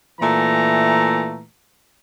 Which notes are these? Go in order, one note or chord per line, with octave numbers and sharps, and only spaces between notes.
A#2 E3 A3 A#5